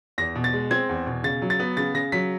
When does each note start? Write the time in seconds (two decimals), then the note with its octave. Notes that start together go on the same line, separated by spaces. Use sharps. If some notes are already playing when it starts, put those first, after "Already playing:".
0.18 E2 A#6
0.36 B2
0.44 A6
0.53 G#3
0.71 C4 G#6
0.89 E2
1.07 B2
1.23 C#3 A6
1.42 F#3
1.50 A6
1.60 B3
1.77 C#3 A6
1.94 C#3 A#6
2.12 F#3 B6